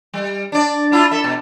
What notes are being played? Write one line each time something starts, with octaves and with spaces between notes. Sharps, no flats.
G3
D4 D5
D4 E4 F4
A4 E5
B2